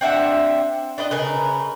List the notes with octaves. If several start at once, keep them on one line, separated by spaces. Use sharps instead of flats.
C4 D4 E5 F#5
D4 B4 D#5
C#3 A#4 B4